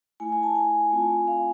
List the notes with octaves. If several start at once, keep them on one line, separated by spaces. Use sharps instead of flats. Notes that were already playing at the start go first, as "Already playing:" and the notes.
A3 E4 G#5
G#5
A5
G#5
A3 C4 F4
F5